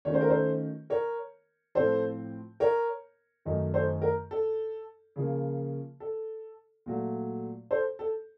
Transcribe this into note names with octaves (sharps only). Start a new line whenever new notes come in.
D#3 A3 C#4 F4 C#5
C5
A#4
A4 C5
A#4 C#5
A2 F3 C4 A4 C5
A#4 C#5
F#2 D#3 A3 D#4
A4 C5
A#4
A4
C#3 F3 A#3
A4
A#2 F#3 A3
A4 C5
A4